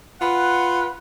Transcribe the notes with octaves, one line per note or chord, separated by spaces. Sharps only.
F4 B4 F#5